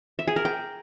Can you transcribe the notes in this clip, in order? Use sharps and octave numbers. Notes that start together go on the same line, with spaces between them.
E5
G#4
A#4
G5